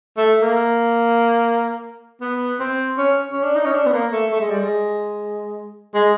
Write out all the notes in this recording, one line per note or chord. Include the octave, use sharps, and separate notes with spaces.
A3
A#3
B3
C4
C#4
C#4
D4
D#4
C#4
D4
B3
A#3
A3
A3
G#3
G3
G#3
G#3